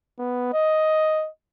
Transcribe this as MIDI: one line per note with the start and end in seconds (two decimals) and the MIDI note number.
0.19 0.50 59
0.53 1.29 75